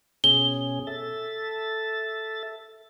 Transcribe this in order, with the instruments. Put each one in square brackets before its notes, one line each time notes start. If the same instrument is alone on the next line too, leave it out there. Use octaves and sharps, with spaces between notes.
[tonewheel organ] B2 C#4 G#4 [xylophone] G7
[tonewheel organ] A4 E5 A6